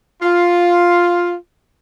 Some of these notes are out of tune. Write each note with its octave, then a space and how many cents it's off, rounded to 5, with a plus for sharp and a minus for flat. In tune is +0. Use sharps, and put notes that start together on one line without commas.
F4 +5